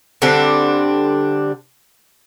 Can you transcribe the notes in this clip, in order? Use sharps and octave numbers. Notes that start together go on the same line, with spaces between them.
D3 G3 C4 D4